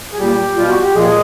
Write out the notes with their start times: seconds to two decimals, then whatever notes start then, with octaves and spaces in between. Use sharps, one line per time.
0.13 G#4
0.18 A#2 G3 G4
0.56 B2 G3 F4
0.70 F#4
0.82 G4
0.94 A#2 F3 G#3 G#4